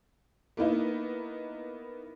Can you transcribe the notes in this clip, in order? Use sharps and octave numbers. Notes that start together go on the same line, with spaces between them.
A#3 B3 D#4 E4